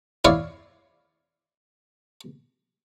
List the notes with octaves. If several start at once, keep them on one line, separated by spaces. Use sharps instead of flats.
E4 C#5 D5 F5 C#6